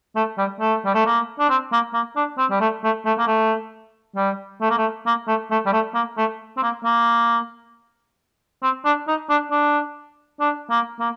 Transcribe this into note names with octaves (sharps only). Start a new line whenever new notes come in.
A3
G3
A3
G3
A3
A#3
D4
C4
A#3
A#3
D4
C4
G3
A3
A3
A3
A#3
A3
G3
A3
A#3
A3
A#3
A3
A3
G3
A3
A#3
A3
C4
A#3
A#3
C4
D4
D#4
D4
D4
D4
A#3
A#3